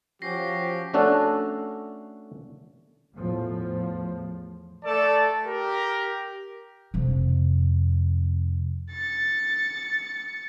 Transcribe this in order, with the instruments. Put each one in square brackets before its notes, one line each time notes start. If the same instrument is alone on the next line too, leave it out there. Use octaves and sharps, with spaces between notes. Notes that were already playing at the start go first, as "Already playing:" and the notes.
[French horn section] F3 [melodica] C#4 F#4 [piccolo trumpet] G4 [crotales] A#6 C7
[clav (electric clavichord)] A3 C#4 D4 F#4 A4
[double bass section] E2 A2 F3
[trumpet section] A3 A4 D5 A5
G4 A#4
[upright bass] F2 C3
[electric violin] A6 C#7